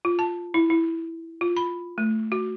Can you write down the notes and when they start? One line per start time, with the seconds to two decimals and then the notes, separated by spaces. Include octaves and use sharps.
0.05 F4
0.19 A5
0.54 E4
0.70 E4
1.41 F4
1.57 B5
1.98 A3
2.32 F#4